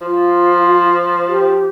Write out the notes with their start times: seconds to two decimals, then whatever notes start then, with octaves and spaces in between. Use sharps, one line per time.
0.02 F3 F4
1.28 G4